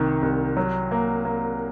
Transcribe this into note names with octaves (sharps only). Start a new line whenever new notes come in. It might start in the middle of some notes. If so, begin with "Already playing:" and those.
Already playing: C2 C3 D#3
C2
F#3
A#3
A#3